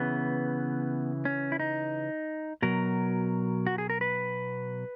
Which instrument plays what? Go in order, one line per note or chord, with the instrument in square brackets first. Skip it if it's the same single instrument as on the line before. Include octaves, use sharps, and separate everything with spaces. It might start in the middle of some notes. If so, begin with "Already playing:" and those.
Already playing: [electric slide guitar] C#3 E3 B3
C#4
E4
D#4
B2 F#3 A#4
F#4
G#4
A#4
B4